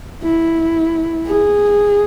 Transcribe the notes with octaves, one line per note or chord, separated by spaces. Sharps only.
E4
G#4